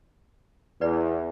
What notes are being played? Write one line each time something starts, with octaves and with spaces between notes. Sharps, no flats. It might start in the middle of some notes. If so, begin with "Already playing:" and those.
E2 B4 D5